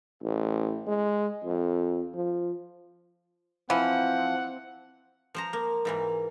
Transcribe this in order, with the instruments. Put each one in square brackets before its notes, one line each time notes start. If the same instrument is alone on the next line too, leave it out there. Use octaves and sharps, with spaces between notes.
[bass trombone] A1
G#3
F2
F3
[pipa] E3 [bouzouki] F3 [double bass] C4 [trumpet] F#5
[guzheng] F3 C5 A#5
A#3
G#2 E3 A#3